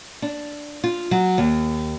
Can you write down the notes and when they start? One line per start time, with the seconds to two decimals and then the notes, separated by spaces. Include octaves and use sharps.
0.22 D4
0.84 F4
1.11 F#3
1.38 D#2